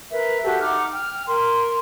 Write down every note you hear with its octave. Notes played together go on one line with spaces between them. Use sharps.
A#4 B4 E5
F#4 G4 A4 E5
D#4 F#5 D6 F6
G5 F6
A#4 C6